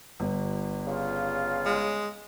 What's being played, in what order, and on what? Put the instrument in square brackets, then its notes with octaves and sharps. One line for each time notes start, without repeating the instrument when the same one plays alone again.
[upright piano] G1
[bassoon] C#3 [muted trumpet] F4
[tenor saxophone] G#3